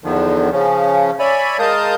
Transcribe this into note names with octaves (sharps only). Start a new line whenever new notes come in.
E2 D3 D#3 F3
C#3 F3 C#4
C#5 D5 E5 G#5 B5
G#3 A#4 F5 A5 D#6 G6